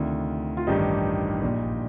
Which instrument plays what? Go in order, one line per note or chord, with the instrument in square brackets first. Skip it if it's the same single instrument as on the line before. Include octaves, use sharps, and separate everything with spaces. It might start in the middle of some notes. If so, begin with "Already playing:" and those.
Already playing: [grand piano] D2 C3 D#3 D4 F4
F4
A1 G2 D#3 D#4 G4
A#1 A#2